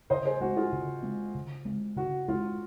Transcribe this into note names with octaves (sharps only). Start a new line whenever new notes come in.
C#3 C5 D#5
G#4 C5
G#3 C4 F#4
F4 G#4
C#3
G#3 C4
C#3
G#3 C4
C#3 F#4
G#3 C4 F4